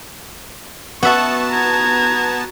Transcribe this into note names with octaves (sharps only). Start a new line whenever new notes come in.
B3 F#4 E5 A5 C#6
A#5 G#6